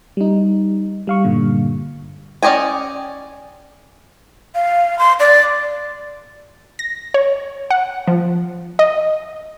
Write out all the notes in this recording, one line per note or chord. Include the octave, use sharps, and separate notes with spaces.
G3 D#4
G3 F5 C#6
G2 A#2 D3
C#4 D5 D#5 G5 G#5
F5
C6
D5
A#6
C#5
F#5
F3
D#5